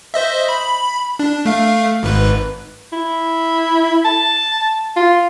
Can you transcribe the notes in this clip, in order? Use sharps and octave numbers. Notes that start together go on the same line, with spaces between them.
C5 D#5 E5
B5
D4
A3 F5
G#1 G#2 B4
E4
A5
F4